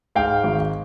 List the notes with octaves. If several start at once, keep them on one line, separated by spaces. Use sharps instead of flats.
G#2 F5 G5
G#1